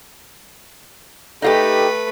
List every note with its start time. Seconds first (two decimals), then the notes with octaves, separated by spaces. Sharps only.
1.42 A3 D#4 F4 G4 A4 B4